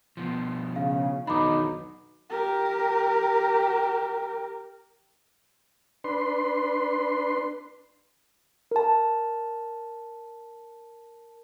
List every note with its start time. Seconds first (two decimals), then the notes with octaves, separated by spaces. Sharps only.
0.17 B2 F3
0.76 C#3 F5
1.27 B1 E2 B2 D#3 D4 D#4 B5 D6
2.30 G4 A#4
6.04 D4 B4 C6
8.71 A#4 A5